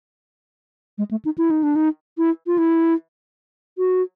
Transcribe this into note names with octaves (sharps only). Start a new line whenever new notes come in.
G#3
A3
D#4
E4
D#4
D4
D#4
E4
F4
E4
F#4